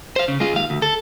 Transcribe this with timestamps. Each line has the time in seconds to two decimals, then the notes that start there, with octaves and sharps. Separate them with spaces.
0.16 C5 F5
0.28 C#3
0.40 G#3 F4
0.54 D#2 F5
0.70 D2
0.82 A4